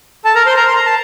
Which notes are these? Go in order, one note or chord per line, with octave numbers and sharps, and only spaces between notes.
A4 A5
A#4 A#5
C5 C6
A#4 A#5
C6
A#5
A5